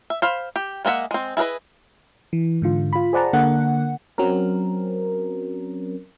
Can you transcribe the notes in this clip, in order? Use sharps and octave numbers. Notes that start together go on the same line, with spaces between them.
E5
C5 F5 B5
G4
G#3 A#3 C#4 E5 F#5
G#3 C4
E4 G#4 A#4 B4 D#5
E3
G#2 D3 F4
F4 B5
G#4 C5 D5 F#5 A5 A#5
D3 A#3 F#5
F#3 C4 C#4 A#4